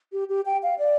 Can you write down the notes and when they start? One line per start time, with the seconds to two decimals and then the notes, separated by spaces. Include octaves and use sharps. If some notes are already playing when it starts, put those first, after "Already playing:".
0.12 G4
0.29 G4
0.46 G5
0.63 F5
0.79 D5